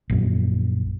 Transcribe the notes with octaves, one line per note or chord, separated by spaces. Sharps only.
A#1 F#2